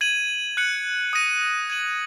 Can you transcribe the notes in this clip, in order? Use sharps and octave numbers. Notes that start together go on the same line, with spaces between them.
G#6 D#7 F#7
F#6 C#7 F#7
D#6 A#6 D#7
G#6 D#7 F#7